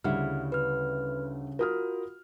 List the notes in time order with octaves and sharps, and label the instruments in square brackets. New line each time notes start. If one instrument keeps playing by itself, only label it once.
[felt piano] D2 E5 [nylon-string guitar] C#3 G3 E4 [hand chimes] F#5 F6
[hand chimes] B4 F6
[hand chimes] F4 F#4 [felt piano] A#4 D#6 F6